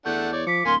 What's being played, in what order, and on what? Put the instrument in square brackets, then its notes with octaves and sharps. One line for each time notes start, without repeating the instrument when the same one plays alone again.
[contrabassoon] E2 [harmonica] A3 D4 F#5 [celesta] G6
[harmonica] C#5 D5
[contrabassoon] F3 [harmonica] D6 [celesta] B6 C#7
[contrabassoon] D1 [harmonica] A#3 F5 G#5 [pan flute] C6